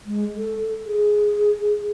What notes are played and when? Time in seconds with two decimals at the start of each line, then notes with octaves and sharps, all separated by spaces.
0.06 G#3
0.37 A4
0.86 G#4